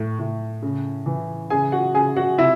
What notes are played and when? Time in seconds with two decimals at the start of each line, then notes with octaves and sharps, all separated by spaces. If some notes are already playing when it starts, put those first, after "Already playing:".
Already playing: A2
0.19 A2
0.62 C#3
1.06 E3
1.50 C#3 G#4 G#5
1.72 F#4 F#5
1.94 C#3 G#4 G#5
2.17 F#4 F#5
2.38 C3 E4 E5